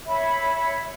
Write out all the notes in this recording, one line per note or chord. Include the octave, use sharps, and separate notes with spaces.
C#5 E5 B5